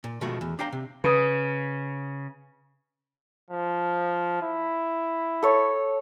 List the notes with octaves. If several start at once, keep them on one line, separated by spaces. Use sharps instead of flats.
A#2
B2 D#3 F3 G#3 A3 F#4
E2
D4 C5 F5 G5 A#5
C3
C#3 B4 D#6
F3
E4
A4 C#5